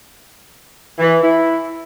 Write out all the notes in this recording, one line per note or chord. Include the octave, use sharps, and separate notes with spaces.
E3
E4